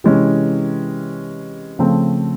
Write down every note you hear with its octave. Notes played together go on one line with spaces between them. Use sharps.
C3 E3 G#3 C#4
C#3 F3 A3 C4